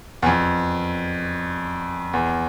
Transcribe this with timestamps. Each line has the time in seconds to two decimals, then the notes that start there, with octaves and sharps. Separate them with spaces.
0.22 E2
0.26 F2
2.13 E2